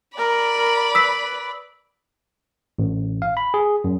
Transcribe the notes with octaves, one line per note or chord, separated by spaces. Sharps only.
A#4 D5 B5
A#4
B4 D#6 E6 B6
A1
F5
B5
G#4
F#2